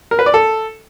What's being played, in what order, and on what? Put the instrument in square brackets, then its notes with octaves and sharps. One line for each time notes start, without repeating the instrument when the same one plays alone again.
[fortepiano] A#4
B4
D5
A4